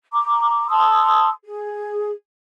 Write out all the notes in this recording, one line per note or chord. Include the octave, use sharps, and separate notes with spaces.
A#5 D6
A5 C6 D#6 E6
G#4